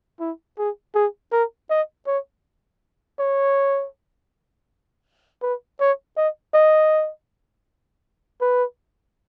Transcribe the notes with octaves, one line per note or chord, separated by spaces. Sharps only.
E4
G#4
G#4
A#4
D#5
C#5
C#5
B4
C#5
D#5
D#5
B4